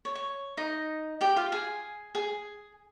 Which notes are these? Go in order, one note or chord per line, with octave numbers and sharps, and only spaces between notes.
C#5
C#5
D#4 D#5
G4 G5
F4 F5
G#4 G#5
G#4 G#5